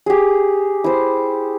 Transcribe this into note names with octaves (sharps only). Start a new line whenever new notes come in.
G4 G#4
E4 C5